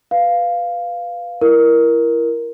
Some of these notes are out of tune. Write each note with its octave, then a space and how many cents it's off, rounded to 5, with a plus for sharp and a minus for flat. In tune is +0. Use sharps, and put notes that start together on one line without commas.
B4 +0 F5 +0
E4 +25 A#4 +10